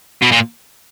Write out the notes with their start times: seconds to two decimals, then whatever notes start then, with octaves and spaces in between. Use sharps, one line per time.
0.22 B2
0.32 A#2